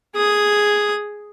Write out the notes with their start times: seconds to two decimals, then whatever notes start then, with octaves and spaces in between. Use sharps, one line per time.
0.16 G#4 D#6